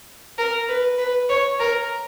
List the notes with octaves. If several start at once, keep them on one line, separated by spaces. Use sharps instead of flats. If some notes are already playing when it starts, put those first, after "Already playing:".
A#4
B4
B4
C#5
A#4